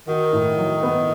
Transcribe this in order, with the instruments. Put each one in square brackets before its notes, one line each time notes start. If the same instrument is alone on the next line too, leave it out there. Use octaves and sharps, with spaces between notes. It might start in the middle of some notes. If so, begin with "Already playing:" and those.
[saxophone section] D#3 [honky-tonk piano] F#4
[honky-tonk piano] A2
F#3
B3